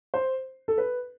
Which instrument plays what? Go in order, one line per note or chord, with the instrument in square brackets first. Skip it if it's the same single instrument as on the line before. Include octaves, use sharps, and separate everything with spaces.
[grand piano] C5
A4
B4